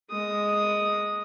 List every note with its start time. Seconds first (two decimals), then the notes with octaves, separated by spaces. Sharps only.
0.11 G#3 D#6